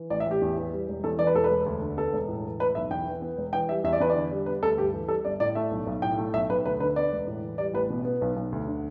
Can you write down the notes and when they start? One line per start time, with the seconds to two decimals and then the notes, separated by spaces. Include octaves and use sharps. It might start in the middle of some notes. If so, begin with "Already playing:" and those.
Already playing: E3
0.10 A1 D5
0.20 E5
0.26 A1 G4
0.41 E2
0.57 E3
0.72 G3
0.88 E1
1.04 E2 A4
1.19 E3 D5
1.27 B4
1.35 E1 A4
1.44 B4
1.51 E1
1.66 D2
1.82 D3
1.97 B3 A4
2.13 E1
2.28 A2
2.44 E3
2.60 A3 B4
2.75 B1 E5
2.90 E2 G5
3.07 E3
3.22 B3
3.37 E1
3.53 E3 G5
3.69 G3 E5
3.84 E2 E5
3.93 D5
4.00 E2 B4
4.10 D5
4.15 D3
4.31 G3
4.46 B3 B4
4.63 D2 A4
4.78 G2 G4
4.93 E3
5.08 G3 A4
5.25 G1 D5
5.40 A2 D5
5.55 A3 E5
5.71 B1
5.87 B1
6.02 A2 G5
6.18 A3
6.34 B1 E5
6.50 B1 B4
6.65 D2 B4
6.80 D3 B4
6.96 B3 D5
7.12 E1
7.27 A2
7.43 E3
7.58 G3 D5
7.73 A1 B4
7.90 B2
8.05 B3
8.21 B1
8.36 B1
8.52 D2
8.67 D3